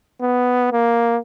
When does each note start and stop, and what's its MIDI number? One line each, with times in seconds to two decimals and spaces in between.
0.21 0.71 59
0.72 1.17 58